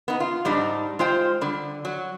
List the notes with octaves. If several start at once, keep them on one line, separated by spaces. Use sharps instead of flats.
B3 D#4
F4
G#2 G3 D4 D#4
G#3 F4 C5 G5
D3 G3
F#3